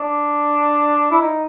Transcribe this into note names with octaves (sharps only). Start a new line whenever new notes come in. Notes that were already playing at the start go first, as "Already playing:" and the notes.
Already playing: D4
E4
D#4